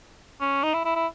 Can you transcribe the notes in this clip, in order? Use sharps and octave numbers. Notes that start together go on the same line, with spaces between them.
C#4
D#4
E4
E4
E4